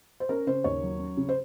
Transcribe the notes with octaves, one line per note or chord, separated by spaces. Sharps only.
C5
C#4 A#4
C#3 C5
D#2 C#5
F#3
C#4
C#3
C5